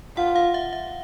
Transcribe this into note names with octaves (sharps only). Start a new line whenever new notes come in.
F4 F#5
F5
E5
E5